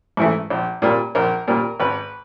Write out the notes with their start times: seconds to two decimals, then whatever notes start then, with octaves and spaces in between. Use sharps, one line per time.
0.17 G#2 E3 A3
0.50 A#1
0.82 A#2 G3 A#3
1.15 A#1 A#4
1.47 A#2 G3 A#3 A#4
1.80 G#1 B4